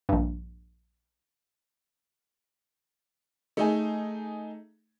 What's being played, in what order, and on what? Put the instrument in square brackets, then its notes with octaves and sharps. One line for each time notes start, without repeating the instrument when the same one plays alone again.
[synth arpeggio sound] A#1 G2
[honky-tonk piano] A3 D#4 G#4